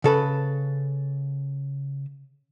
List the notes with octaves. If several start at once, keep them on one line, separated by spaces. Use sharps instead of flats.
C#3 A4 B4